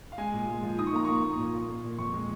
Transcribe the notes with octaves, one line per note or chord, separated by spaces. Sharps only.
F5
G#3 G#5
A#2
G#3
F3
D#4 D#6
C#6
A#3 A#5
A#3 C#6
A#3
A#2
A#3
A#3
A#2
F2 C#6
G#3